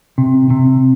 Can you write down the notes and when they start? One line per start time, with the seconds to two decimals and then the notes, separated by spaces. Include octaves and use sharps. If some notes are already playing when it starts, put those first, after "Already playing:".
0.18 C3
0.50 C3